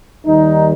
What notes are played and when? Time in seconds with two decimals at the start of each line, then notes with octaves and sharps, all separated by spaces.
0.24 D#2 D#3 G3 D#4